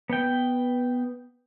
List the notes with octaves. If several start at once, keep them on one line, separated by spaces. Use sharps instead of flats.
B3 G5